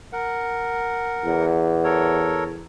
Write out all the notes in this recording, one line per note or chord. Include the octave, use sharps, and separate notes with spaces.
A#4 F#5
E2
A4 A#4 C#5